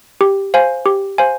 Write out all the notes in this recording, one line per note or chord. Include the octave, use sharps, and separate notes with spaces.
G4
C5 F5 G#5
G4
C5 F5 G#5